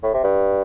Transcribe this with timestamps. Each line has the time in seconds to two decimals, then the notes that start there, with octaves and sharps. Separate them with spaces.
0.03 A2
0.14 C3
0.23 G2